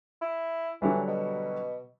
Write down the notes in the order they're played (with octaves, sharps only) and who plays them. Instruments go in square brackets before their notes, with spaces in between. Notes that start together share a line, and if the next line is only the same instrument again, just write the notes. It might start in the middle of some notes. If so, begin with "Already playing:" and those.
[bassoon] E4
[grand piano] D3 F#3 G3 [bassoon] E3
[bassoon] B2